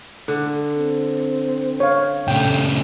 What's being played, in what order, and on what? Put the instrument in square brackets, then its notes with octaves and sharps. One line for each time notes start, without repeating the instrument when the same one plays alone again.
[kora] D3
[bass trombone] C4
[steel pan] C#5 F5
[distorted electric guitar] A#2 C#3 [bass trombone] A3 [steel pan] G5